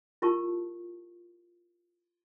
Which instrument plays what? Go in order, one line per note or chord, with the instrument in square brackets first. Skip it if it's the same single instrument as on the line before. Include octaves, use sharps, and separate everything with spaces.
[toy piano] E4 F4 G4 A#4 A5 C#6